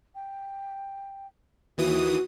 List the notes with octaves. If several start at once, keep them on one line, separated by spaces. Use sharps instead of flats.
G5
D#2 E3 F#4 D#6